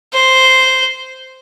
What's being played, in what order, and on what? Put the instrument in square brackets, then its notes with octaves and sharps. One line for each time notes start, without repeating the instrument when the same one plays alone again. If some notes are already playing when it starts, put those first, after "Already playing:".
[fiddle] C5